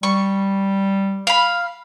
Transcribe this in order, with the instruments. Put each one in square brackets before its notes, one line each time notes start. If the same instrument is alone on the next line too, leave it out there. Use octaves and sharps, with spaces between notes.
[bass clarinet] G3 [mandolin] C#6
[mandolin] F5 B5